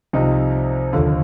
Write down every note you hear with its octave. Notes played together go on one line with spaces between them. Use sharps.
C2 C3 F3 C4 D#4
F1 D#2 D3 F3